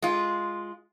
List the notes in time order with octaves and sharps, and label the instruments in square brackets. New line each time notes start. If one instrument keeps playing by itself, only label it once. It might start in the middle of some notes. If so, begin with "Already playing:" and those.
[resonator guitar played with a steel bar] G#3 F4